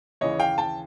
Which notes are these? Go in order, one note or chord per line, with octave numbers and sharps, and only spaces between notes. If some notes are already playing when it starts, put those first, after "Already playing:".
D#2 C#3 E3 C#5 D#5
F5 G5
G5 A5